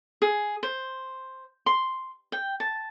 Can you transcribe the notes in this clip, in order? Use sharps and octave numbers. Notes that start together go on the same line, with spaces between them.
G#4
C5
C6
G5
A5